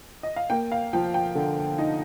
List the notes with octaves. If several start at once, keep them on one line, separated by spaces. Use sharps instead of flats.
D#5
F5
A#3 G5
F5
F3 G5
G5
D3
D#4